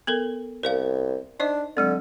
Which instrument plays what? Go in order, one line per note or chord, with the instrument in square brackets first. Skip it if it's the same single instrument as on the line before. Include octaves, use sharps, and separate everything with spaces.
[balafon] B3 A4 A#4
[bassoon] C2 [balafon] A#4 D5 F5
[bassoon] D4 [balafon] D#4 C5 D#5
[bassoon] D3 [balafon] F#3 G#3 C4